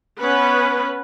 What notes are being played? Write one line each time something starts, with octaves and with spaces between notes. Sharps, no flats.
B3 C#4 B4